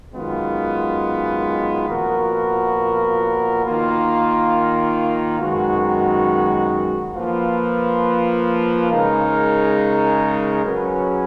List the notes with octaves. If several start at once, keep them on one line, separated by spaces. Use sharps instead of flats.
F#2 D#3 G#3 B3 F4
A#2 F3 B3 F#4 A#4
D#3 A#3 F4
F#2 D#3 G#3 B3 F#4
F3 A#3 F4 B4
C#3 G#3 D#4 A#4
F#3 C#4 G#4 B4